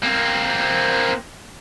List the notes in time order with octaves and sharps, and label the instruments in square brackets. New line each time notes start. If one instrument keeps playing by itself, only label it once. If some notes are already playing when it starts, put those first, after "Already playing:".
[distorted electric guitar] A#3 C4